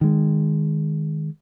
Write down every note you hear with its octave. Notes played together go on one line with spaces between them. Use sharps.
D#3 G#3